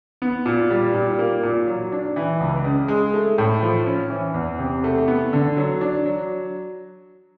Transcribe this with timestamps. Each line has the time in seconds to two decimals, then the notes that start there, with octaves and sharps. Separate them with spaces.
0.22 B3
0.46 A#2
0.70 G3
0.94 A#2
1.19 A#3
1.43 A#2
1.67 F#3
1.92 D4
2.16 E3
2.41 C#2
2.65 C#3
2.88 G#3
3.14 A3
3.38 A2
3.62 F3
3.86 C#4
4.10 E3
4.34 E2
4.59 C3
4.84 A3
5.08 B3
5.33 D3
5.57 F#3
5.81 D4
6.06 F#3